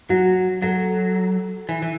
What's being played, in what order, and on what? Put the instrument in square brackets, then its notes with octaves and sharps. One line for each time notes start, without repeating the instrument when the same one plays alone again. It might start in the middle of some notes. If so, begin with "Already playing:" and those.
[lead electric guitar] F#3 [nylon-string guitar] F#4
[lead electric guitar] F#3 [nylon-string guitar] A4
[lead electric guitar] E3
E3